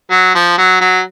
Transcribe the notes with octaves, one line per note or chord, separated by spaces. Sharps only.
F#3
F3
F#3
F#3